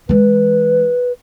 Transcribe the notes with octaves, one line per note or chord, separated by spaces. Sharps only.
E3 G#3 B4